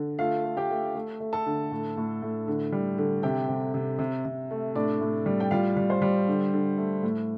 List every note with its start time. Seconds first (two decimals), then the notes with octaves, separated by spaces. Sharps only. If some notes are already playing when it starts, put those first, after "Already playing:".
Already playing: D3
0.19 A3 F4 F5
0.45 A3
0.57 G4 G5
0.70 A3
0.95 A3
1.20 A3
1.33 A4 A5
1.46 D3
1.71 A2
1.97 A2
2.22 A2
2.48 D3
2.72 G3
2.98 D3
3.23 C3 G4 G5
3.49 C3
3.74 C3
3.99 C3
4.25 C3
4.51 A3
4.75 A2 D4 D5
5.01 A2
5.26 G3
5.40 G5
5.51 G3 F4 F5
5.77 G3
5.90 C5
6.02 G3
6.28 D3
6.53 D3
6.78 A3
7.03 A2